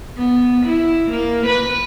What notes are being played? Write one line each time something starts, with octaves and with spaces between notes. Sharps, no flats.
B3
E4
A#3
B4